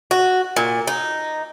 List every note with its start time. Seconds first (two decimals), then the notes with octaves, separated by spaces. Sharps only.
0.11 F#4
0.56 A#2
0.87 D#4